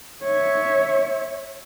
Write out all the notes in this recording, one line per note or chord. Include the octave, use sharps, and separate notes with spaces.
C#5 E5